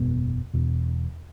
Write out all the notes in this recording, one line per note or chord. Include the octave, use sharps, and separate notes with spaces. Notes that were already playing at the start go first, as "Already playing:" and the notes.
Already playing: F#1 E2 B2 B3
E1 E2 B2